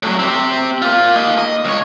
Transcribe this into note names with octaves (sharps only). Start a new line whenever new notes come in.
A2 F#3
C4 G4
A#3 F4
A#3 D#5
D#5
C#2 C#5